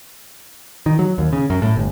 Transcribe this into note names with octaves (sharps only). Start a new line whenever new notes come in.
D#3
F#3
D#2
C#3
F#2
A2
G1